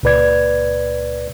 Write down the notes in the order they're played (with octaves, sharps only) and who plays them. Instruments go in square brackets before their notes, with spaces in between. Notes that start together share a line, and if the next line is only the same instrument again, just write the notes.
[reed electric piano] C#2 A#2 B4 D5 G#6